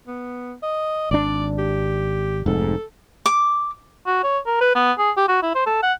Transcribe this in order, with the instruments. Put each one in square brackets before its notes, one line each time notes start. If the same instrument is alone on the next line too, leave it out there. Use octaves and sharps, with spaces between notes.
[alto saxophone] B3
D#5
[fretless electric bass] G#1 D4 [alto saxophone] D5
[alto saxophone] G4
[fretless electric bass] F1 G#2 [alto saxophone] A4
[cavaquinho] D6
[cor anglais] F#4
C#5
A#4
B4
B3
G#4
G4
F#4
E4
C5
A4
F#5